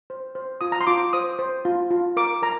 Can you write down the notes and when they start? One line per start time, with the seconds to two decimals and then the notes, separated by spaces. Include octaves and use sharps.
0.10 C5
0.35 C5
0.61 F4 D#6
0.72 A#5
0.81 C6
0.87 F4 D6
1.13 C5 D#6
1.39 C5
1.65 F4
1.91 F4
2.17 A#4 D6
2.42 A#4 A#5